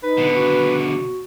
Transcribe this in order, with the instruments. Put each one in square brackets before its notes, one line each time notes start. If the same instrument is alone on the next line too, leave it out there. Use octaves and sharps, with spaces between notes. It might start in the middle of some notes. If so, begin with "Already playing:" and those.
[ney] D#4 [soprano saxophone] B4
[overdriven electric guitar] B2 D3
[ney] F#4